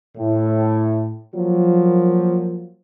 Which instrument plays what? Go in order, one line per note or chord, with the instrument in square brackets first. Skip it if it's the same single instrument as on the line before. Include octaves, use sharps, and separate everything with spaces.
[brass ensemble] A2
[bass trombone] F3 [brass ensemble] F#3 A#3